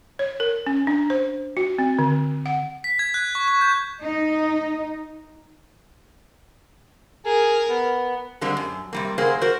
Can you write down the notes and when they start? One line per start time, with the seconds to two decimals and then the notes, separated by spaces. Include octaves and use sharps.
0.19 C#5
0.40 A#4
0.67 C#4
0.87 D4
1.10 C5
1.57 F#4
1.78 C4
1.99 D3
2.46 F#5
2.84 B6
2.99 G#6
3.14 F#6
3.35 C#6
3.48 C#6
3.61 G6
4.04 D#4
7.26 G#4 A#4
7.69 B3
8.41 D3 G3 G#3 A#3 C4
8.57 F#2
8.93 C3 G3 A#3
9.18 C#3 F#3 A#3 G#4 C5
9.41 F#4 A#4 C5